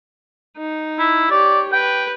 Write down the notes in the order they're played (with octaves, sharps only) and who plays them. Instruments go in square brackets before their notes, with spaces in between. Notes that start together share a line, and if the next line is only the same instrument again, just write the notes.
[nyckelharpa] D#4
[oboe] E4
[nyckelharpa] G4 C#5 [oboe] D5
[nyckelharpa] B4 [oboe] G5